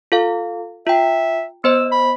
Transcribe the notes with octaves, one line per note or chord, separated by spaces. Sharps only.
F4 A4 F5
F4 E5 G5
B3 C5 D#5 E6
B5